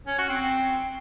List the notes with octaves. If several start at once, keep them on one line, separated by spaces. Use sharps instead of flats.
C#4
F#4
C4